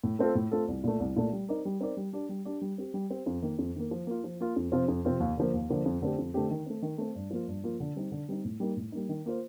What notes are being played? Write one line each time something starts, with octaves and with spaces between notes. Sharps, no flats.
A2
A3 C4 F4 A4
A2
A3 C4 F4 A4
C2
A#2 A3
C2
A#2 A3
G3
C4 D#4 A#4 D5
G3
C4 D#4 A#4 D5
G3
D4 G4 D5
G3
D4 G4 D5
G3
C4 G4
G3
C4 G4
F2
D#3 A#3
F2
D#3 A#3
F3
A#3 F4
F3
A#3 F4
F2
C3 F3 C4 F4
F2
C3 F3 C4 F4
D#2
D3 F3 A#3
D#2
D3 F3 A#3
F2
D3 A3 C4 G4
F2
D3 A3 C4 G4
D#3
A3 C4
D#3
A3 C4
G2
F3 A#3 F4
G2
F3 A#3 F4
D3
G3 C4 D#4
D3
G3 C4 D#4
A2
G3 A#3 D#4
A2
G3 A#3 D#4
D#3
A#3 F4 C5